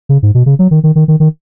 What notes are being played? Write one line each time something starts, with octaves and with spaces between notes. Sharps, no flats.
C#3
G#2
B2
C#3
F#3
D#3
D#3
D#3
D#3
D#3